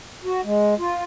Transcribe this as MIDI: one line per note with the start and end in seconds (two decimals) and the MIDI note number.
0.25 0.41 66
0.45 0.74 56
0.79 1.04 65